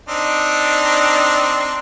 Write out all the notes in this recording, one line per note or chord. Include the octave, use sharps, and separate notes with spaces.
C4 D4 D#4